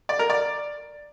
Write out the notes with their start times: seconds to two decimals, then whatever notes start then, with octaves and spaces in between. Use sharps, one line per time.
0.09 D5
0.19 A#4
0.30 D5